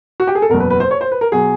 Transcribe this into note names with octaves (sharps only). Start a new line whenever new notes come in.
F#4
G4
G#4
A4
F#1 E2 B2 A#4
B4
B4
C5
C#5
C5
B4
A#4
B2 F#3 G#4